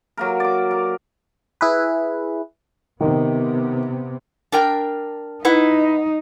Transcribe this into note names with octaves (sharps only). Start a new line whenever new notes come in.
F#3 A#3 A#4
D5 D6
A#4
E4 G#4 B4
C3 D#3 B3
D4 A#4 G5
D#4 E4 B4 F#5